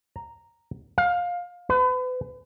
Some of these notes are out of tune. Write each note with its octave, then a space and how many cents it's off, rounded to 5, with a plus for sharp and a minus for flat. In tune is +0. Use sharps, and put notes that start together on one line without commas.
A#5 -5
F5 +20
B4 +40